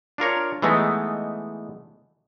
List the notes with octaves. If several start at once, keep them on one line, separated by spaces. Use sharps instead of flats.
D4 F4 A#4 C#5
E3 G#3 A3 B3 D#4 E4